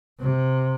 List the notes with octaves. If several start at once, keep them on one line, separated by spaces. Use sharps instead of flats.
C3